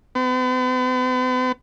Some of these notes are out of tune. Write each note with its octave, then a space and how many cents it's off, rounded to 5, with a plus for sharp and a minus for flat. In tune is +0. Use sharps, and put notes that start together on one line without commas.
B3 +45